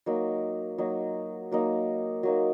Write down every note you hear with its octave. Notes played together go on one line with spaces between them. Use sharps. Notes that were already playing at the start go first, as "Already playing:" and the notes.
F#3 A#3 D#4
F#3 A#3 D#4
F#3 A#3 D#4
F#3 A#3 D#4